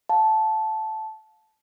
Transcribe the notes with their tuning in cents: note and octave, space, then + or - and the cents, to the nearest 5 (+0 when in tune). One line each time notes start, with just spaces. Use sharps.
F5 +30 A5 -10